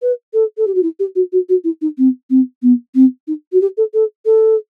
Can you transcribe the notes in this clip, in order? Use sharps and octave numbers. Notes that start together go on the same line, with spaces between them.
B4
A4
A4
G4
F#4
E4
G4
F#4
F#4
F#4
E4
D#4
C4
C4
B3
C4
D#4
F#4
G4
A4
A4
A4